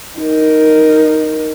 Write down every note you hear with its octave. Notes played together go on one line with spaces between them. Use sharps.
D#4 A#4